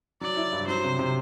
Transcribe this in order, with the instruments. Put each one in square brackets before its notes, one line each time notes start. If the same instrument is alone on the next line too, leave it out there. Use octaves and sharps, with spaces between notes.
[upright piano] F#3 [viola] D5
[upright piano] E4
G2
[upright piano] F#3 [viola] C5
[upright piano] C3
C3